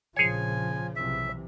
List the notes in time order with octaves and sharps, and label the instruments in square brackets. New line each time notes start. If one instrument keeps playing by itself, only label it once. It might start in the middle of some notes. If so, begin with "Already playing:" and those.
[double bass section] A#1 [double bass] C#3 F3 [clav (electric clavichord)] G#4 C#5 [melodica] G#5
[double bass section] B1 C3 E3 [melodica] E5